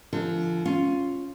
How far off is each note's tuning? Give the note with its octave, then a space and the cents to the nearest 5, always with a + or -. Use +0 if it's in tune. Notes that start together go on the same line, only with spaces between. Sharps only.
D3 -15 F3 -35 A4 +40
C#4 +0 F4 +0